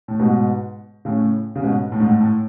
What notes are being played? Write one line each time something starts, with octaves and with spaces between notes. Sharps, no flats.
A2
G#2 B2
A2 C#3
C#3
G#2 B2
A2
G#2
A2
A2